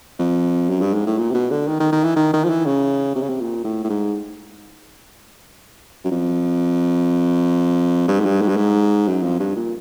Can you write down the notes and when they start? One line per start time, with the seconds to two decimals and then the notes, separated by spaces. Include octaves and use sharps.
0.19 F2
0.69 F#2
0.81 G2
0.94 G#2
1.06 A2
1.18 A#2
1.30 C3
1.34 B2
1.51 D3
1.68 D#3
1.80 D#3
1.92 D#3
2.04 E3
2.16 D#3
2.33 D#3
2.44 F3
2.50 E3
2.66 C#3
3.15 C3
3.22 C#3
3.29 C3
3.40 A#2
3.64 A2
3.84 A2
3.90 G#2
6.04 F#2
6.11 F2
8.08 G2
8.20 G#2
8.26 G2
8.41 G#2
8.48 G2
8.57 G#2
9.07 F#2
9.23 F2
9.40 G2
9.56 A#2